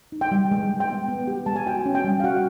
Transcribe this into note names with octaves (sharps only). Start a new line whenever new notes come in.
D#4
G5
G3
G#3
G#3
G5
B3
B3
G4
G#3 A5
G#5
F#4 G5
C#4
G5
G3
F5
F#4 F#5